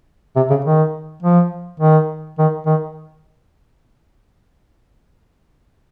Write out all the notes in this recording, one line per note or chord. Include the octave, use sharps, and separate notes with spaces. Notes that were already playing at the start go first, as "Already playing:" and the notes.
C3
C#3
D#3
F3
D#3
D#3
D#3